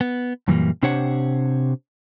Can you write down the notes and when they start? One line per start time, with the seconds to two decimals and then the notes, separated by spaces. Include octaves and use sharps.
0.01 B3
0.48 F#2 A#2 E3 G3 A#3
0.83 C3 D4 G4 C5 C#5 F#5